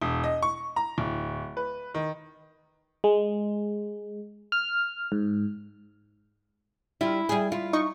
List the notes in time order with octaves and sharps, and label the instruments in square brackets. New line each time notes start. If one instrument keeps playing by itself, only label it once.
[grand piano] E1
D#5
C#6
A#5
D1
B4
D#3
[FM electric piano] G#3
F6
G#2
[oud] G3 F4 [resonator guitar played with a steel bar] E4
[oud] G3 G#4
[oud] E4 [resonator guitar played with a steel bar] F4
[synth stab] D#4 D#5 C#6